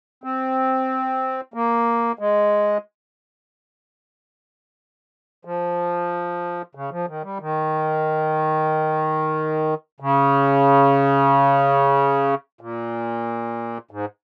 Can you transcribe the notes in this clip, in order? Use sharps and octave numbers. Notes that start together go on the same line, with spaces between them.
C4
A#3
G#3
F3
C#3
F3
D#3
G3
D#3
C#3
A#2
G#2